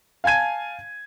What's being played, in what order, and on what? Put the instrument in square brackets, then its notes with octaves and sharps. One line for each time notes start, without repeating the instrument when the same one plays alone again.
[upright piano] F5 G#5 A5 G#6 D#7